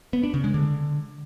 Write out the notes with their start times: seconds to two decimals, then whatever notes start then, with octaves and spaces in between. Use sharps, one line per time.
0.13 B3
0.23 D4
0.34 C#3
0.44 G#3
0.54 D3